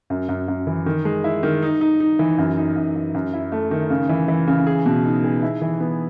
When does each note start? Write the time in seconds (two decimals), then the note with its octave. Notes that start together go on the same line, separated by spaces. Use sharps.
0.10 F#2
0.29 F#2
0.48 F#2
0.67 E3
0.86 D#3
1.05 G#3
1.24 E4
1.43 D#3
1.62 D#4
1.81 D#4
2.00 D#4
2.19 E3
2.38 F#2
2.57 D#4
2.76 F#2
2.95 F#2
3.15 F#2
3.33 E4
3.52 A3
3.71 D#3
3.90 C#3
4.09 E3
4.28 E3
4.47 C#3
4.67 G#4
4.86 B2
5.05 D#4
5.24 G#4
5.43 E4
5.62 E3
5.80 B3